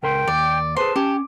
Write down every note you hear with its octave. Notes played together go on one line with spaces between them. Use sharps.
C#2 A#4 G5 C6
D#2 D5
G#4 B4 C5 A5 C6
C#4 G4